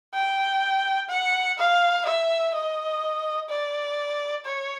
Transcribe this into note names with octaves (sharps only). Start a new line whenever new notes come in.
G5
F#5
F5
E5
D#5
D5
C#5